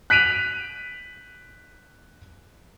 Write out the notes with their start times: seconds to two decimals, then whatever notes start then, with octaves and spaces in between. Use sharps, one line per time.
0.10 F#6 B6 D7 D#7 F7